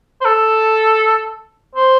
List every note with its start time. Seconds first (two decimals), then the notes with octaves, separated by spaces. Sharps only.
0.21 C5
0.25 A4
1.75 C5